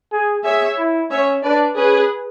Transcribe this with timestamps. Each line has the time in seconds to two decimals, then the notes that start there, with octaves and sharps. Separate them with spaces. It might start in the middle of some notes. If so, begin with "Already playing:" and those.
0.12 G#4
0.44 G#4 C#5 E5
0.78 E4
1.10 C#4 C#5 E5
1.43 D4 B4 D5
1.76 C#4 G#4 B4